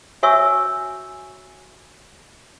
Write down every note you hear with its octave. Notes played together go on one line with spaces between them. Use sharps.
F#4 C#5 E5 G#5 C#6 E6